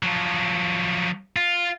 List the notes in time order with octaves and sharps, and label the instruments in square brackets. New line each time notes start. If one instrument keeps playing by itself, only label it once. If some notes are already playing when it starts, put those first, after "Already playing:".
[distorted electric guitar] F3 F#3
F4